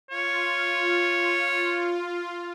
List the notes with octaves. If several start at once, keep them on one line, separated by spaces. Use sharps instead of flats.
F4 C#5